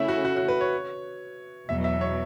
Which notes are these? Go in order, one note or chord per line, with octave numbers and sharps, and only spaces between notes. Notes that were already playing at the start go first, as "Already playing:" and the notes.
Already playing: C#3 A3 C#4 E4 E5
F#4
F#4
F#4
B4
C#5
E2 B2 F#3 E5
E5
C#5